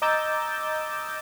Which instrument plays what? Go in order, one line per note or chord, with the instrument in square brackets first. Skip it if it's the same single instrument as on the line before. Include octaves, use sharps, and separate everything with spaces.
[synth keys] D#5 A#5 D6 E6 G6 A6